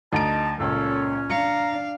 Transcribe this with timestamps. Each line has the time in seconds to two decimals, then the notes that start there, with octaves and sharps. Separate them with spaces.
0.13 D2 D#4 D#5 A5 A#5 D7
0.60 C#2 A#2 C#4 A4
1.30 D4 F5 A#5 C#7